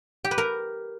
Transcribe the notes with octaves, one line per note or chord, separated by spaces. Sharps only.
G4
B4
A#4